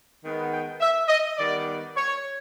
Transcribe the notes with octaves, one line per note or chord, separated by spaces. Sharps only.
D#3 G#3 B3
G5
E5
D#5
D#3 G3 B3 D5
C#5